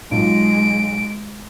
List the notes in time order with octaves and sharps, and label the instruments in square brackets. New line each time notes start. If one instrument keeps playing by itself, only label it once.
[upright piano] B1 F4 [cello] G#3 [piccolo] D7